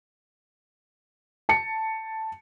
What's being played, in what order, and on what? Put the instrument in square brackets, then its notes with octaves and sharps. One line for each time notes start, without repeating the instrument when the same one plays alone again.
[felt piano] A5 C#7